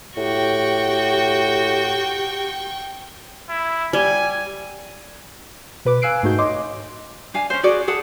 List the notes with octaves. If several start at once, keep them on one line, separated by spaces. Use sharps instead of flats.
A2 F#4 G4 G5 C#6
E4
G3 G#5
B2 B4 D6
F5 G#5 E6 F#6 C7 D7
G#2 A3 D#4 F#4 G6
C#5 D#5 C6 D6
D4 F5 G#5
C#4 C5
F#4 G#4 D5
G#4 A4 F#5